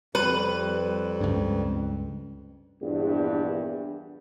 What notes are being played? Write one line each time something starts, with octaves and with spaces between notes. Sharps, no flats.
F2 G3 B4
C#2 G2
A#1 E2 G2